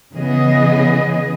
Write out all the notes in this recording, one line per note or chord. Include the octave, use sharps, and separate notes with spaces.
C#3 E3 B3 G#4 D#5